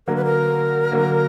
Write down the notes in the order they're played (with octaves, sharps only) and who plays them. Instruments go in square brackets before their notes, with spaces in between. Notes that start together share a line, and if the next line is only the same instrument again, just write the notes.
[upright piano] D3 F#3 A#3 [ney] A#4
[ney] B4
A#4
[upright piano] D3 F#3 A#3